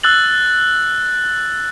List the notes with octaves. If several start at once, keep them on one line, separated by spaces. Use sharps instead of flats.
E6 F#6 A6 F#7